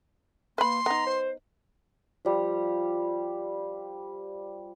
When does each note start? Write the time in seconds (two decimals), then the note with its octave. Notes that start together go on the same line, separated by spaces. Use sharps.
0.58 A#3 B4 B5 C6
0.86 B3 D#4 A#5
1.06 C5
2.25 F3 G3